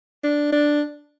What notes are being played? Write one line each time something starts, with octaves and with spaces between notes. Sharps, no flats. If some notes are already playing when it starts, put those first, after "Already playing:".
D4
D4